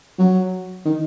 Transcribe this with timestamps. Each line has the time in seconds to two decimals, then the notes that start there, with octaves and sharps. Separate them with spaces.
0.19 F#3
0.85 D#3